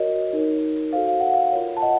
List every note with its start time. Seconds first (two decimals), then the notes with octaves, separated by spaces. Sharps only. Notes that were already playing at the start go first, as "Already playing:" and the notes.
Already playing: F#4 A#4 C#5 D#5
0.33 D#4 A#4 C#5
0.93 F#4 A4 C5 F5
1.08 F5
1.20 F#5
1.34 F5
1.52 F4 A#4 C#5
1.77 A5
1.82 D#5 F#5